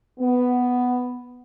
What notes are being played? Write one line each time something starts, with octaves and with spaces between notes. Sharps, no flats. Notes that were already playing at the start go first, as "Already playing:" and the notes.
B3